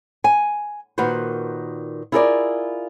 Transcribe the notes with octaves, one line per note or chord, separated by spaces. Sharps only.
G#5
A#2 D#3 F#4 B4 C5
E4 F4 G#4 A#4 C#5 D5